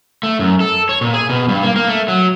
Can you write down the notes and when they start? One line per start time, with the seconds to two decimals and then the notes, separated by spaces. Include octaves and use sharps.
0.23 A3
0.39 F#2
0.60 A4
0.89 C#5
1.01 A#2
1.13 G#4
1.29 B2
1.49 G2
1.63 A#3
1.76 A#3
1.88 A3
2.08 F#3